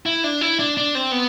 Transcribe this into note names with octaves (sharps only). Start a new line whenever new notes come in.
E4
D4
E4
D4
D4
C4
B3